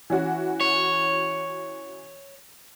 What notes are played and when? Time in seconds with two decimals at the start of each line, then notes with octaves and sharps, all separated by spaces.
0.10 E3 C#4 F#4
0.61 C#5